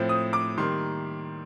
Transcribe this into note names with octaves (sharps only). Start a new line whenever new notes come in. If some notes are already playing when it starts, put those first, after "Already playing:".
Already playing: A2 F3 C4
D#6
D6
D#3 G3 A#3 C6